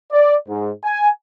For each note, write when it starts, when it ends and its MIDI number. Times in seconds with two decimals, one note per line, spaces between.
0.12 0.35 74
0.48 0.70 44
0.84 1.08 80